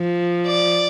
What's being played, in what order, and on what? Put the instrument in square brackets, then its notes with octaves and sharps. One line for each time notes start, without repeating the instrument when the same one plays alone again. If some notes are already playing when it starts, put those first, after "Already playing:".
Already playing: [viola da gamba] F3
[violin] D5